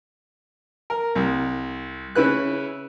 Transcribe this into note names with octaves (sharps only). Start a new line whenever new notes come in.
A#4
C2
C#3 C#4 E4 B4 F#6